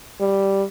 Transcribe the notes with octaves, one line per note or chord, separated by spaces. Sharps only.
G3